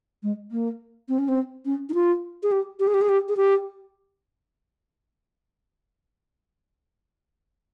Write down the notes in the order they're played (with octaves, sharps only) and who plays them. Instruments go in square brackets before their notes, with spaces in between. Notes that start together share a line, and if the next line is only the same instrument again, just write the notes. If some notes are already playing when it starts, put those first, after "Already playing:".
[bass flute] G#3
A#3
C4
C#4
C4
C#4
D#4
F4
G#4
G4
G4
G#4
G4
G#4
G4
G#4
G4